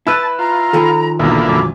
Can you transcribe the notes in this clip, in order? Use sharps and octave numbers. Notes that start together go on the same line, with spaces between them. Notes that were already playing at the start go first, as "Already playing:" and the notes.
E4 B4 A5 B5 E6 F#6
F4 A#5
D#3 F3 G#4 A4 B5
B1 E2 D3 A#3 E4 D#6
E1 F#2 D6